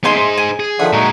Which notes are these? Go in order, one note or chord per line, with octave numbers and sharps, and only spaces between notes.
G#3 B3 D#4 E5 G#5 C6
D#4 C5
G#5
G#4
D3 D#3 F3 E5 F#5
A#2 G#3 D#4 F#4